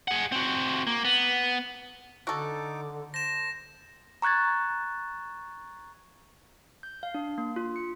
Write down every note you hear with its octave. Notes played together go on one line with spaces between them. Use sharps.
G#4 F#5
C4 F#4
A#3
B3
D3 D#4 F#4 A4 D6
C5 A5 A#6 E7
A#5 C#6 F#6 G#6 A6
G6
F5
D4
A#3
F4
C#7